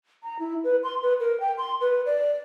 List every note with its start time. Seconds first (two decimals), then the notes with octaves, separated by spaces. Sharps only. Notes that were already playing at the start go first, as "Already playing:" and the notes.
0.23 A#5
0.39 E4
0.64 B4
0.83 C6
1.02 B4
1.20 A#4
1.40 G5
1.58 C6
1.81 B4
2.06 D5